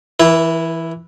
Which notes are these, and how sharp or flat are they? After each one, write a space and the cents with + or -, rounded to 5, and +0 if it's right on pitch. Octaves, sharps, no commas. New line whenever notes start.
E3 +0 E4 +0 B4 -45